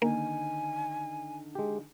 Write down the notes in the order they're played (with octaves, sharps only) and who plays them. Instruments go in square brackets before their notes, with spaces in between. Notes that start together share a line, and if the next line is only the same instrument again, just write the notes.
[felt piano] D3 D#3 [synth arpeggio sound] A#3 [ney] G#5
[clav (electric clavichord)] G#3 G4